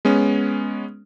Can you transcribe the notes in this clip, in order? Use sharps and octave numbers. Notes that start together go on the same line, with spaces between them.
G#3 B3 C#4